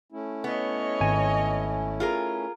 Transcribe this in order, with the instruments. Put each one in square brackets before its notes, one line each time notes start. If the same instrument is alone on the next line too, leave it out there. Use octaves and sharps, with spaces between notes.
[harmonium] A3 C#4 E4
[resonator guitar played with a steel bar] B3 [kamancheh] C#5 D#5
[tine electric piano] G#1 G#5
[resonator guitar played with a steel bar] F4 G#4 A#4